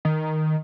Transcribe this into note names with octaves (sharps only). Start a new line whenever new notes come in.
D#3